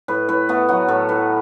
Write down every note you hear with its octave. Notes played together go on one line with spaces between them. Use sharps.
A2 B4
A2 B4
A3 B3
F#3 F#4
A2 A4
A2 B4